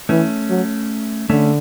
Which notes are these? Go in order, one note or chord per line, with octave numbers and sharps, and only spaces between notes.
E3 A3 C#4
F#3
D3 A3 C#4